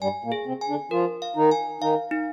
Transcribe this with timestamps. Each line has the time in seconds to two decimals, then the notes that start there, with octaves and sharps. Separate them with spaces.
0.01 G2 G3 G#5
0.24 A#2 A#3
0.32 G#4
0.46 C3 C4
0.61 G#5
0.69 D3 D4
0.91 F3 F4 A#4
1.22 F5
1.36 D#3 D#4
1.52 G#5
1.81 D#3 D#4 F5
2.11 D#4